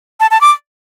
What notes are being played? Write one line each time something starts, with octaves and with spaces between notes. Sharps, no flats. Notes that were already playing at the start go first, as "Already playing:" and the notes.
A5
A5
D6